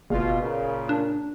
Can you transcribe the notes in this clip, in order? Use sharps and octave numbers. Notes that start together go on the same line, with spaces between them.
F#1 B2 F4
A#2 C#3
D4